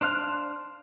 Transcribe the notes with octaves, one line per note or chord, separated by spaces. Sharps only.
D4 C5 F5 F#6